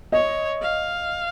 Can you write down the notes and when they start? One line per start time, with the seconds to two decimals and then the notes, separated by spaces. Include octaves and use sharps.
0.12 C#5 D#5
0.62 F5